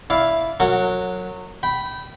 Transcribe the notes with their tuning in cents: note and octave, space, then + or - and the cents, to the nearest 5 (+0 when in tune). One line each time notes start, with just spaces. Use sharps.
E4 +0 D5 -25 F5 +0
F#3 -15 A#4 -35 F#5 +0
G5 -20 B5 +0